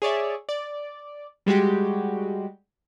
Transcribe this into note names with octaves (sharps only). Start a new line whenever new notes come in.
G#4 C#5 D5 E5
D5
G3 G#3 F#4 G4